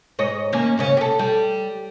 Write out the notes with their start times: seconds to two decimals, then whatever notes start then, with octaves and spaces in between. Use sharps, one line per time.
0.19 G#2 C#5 D#5
0.52 D#2 A#3 C#4
0.77 G#2 C#3 C#4
0.97 G4 A4
1.19 G3